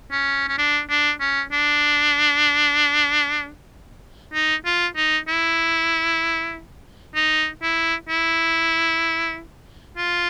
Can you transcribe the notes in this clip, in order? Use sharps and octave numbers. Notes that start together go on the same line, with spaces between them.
C#4
C#4
D4
D4
C#4
D4
D#4
F4
D#4
E4
D#4
E4
E4
F4